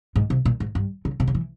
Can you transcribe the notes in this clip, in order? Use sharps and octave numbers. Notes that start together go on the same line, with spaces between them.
G#2
C3
A#2
G#2
G2
C#3
C3
C#3
E3